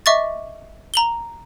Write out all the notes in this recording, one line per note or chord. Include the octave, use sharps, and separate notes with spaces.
D#5 E5 C#6 D6 A6
A#5 F#7 G7